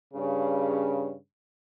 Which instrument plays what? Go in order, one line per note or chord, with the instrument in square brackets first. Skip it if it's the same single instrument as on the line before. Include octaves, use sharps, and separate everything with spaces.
[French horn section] G2 C#3